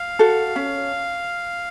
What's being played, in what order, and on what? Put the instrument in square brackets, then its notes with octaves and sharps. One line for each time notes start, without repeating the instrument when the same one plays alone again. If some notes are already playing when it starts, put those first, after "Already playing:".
Already playing: [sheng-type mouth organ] F5
[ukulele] F#4 A4
C#4